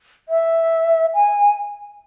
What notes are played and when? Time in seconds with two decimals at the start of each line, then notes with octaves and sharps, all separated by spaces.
0.29 E5
1.14 G#5